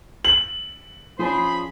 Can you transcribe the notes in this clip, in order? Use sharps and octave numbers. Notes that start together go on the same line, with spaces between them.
F#7
F3 C#4 D4 G#4 C5 B5